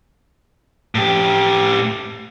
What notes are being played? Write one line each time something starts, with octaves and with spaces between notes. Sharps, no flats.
A2 G4